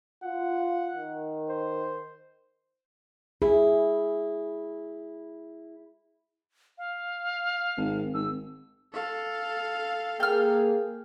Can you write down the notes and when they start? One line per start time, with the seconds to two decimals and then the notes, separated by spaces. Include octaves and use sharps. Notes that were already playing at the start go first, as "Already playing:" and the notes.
0.24 F4 F#5
0.94 D#3
1.50 C5
3.42 E4 G#4
6.78 F5
7.77 G#1
8.14 G#1 E6
8.93 A4 F5
10.20 A#3 G#4 G5 F6